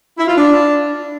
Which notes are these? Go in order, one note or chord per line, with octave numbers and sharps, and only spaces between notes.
E4
F4
D4